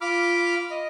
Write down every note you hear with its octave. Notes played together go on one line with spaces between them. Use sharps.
F4 B5 D6 F6
D#5